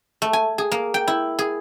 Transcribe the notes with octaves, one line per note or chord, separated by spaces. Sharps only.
A3
G#5
G#4
A#3
G5
E4
G#4